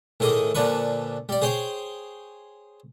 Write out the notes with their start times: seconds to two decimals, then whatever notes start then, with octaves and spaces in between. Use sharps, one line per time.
0.20 A2 D#3 G#4 D#5 D6
0.55 A#2 D3 F3 D4 B4 C#6
1.29 G3 D5
1.42 G#4 C5 C#5 G5